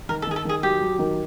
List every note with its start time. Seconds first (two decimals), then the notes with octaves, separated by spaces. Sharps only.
0.09 D#3 A#4
0.22 A4
0.27 D#3 G#4
0.36 A4
0.45 D#3 G#4
0.63 F#3 G4
0.81 F#3
0.99 D#3